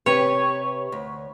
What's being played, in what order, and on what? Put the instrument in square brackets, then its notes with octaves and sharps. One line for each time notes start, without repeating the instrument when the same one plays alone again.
[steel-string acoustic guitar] C3 G4 B4 [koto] C#5
[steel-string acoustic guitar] D2